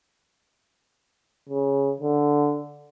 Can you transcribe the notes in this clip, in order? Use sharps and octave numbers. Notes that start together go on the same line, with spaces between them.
C#3
D3